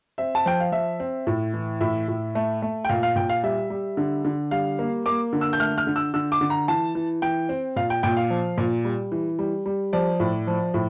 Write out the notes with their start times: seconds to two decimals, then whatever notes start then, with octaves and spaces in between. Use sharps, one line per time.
0.18 C4 E5
0.35 A5
0.46 F3 G5
0.60 F5
0.72 F3 E5
1.00 C4
1.27 A2
1.54 E3
1.81 A2 E5
2.08 A2
2.35 A3
2.62 A3
2.85 G5
2.89 A#2 F5
3.03 F5
3.16 A#2 G5
3.30 F5
3.43 G3 E5
3.70 G3
3.97 D3
4.25 D3
4.51 G3 F5
4.79 A#3
5.06 A#3 D6
5.33 D3
5.41 E6
5.53 G6
5.60 A3 F6
5.78 F6
5.87 D3
5.96 E6
6.14 D3 E6
6.32 D6
6.41 D3
6.50 A#5
6.68 E3 A5
6.95 E3
7.22 E3 G5
7.49 C4
7.76 A#2 F5
7.90 G5
8.03 A#2 G5
8.17 F5
8.30 F3
8.58 A#2
8.85 G3
9.12 E3
9.39 G3
9.66 G3
9.93 F3 D5
10.20 A2
10.47 F3
10.74 A2